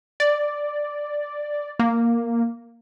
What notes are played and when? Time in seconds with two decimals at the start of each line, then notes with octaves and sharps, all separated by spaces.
0.20 D5
1.79 A#3